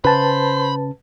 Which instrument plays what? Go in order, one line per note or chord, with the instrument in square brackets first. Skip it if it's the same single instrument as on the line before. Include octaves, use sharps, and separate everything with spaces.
[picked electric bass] C#3 [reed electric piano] B4 A5 [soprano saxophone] C5 [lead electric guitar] B5